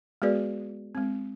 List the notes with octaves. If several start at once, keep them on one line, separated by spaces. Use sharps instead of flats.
G#3 B3 F#4 G#4 B4 D5
G#3 C4